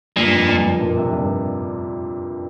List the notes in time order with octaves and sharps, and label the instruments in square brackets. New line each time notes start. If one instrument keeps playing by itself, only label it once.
[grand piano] G2 [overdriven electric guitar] A#2
[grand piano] F2
G2
G2
A#2
C3
G2